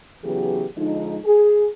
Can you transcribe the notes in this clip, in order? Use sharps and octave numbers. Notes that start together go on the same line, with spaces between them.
C#3 E3 F#3 B3 G4 G#4
D3 F3 G#3 D#4
G#4